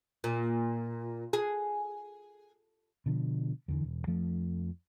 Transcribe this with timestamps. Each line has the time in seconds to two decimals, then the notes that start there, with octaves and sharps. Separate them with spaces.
0.24 A#2
1.33 G#4
3.06 B2 D3 F3
3.68 E2 D3 E3
3.84 E1
4.07 F2 F3 A3